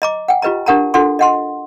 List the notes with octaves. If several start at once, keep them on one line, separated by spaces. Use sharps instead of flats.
D#5 A#5 D6
F#5 G5
F4 G4 B4 D#5 A#5
D4 G4 A#4 F#5 A5 A#5
D4 F4 F#4 A4 F#5 C6
D#5 F#5 C6